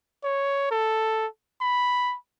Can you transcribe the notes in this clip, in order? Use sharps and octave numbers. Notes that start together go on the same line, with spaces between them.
C#5
A4
B5